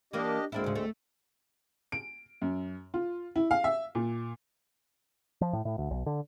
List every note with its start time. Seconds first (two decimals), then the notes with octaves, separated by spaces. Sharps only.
0.13 E3 A#3 D4 G4 D#5
0.52 D2 G#3 A#3 C4 D4 E4
0.64 G#2 C#3
0.75 A3
1.92 D7
2.42 F#2
2.94 F4
3.36 E4
3.51 F5
3.64 E5
3.95 A#2
5.41 F3
5.53 A2
5.65 A2
5.78 D2
5.91 B1
6.06 D3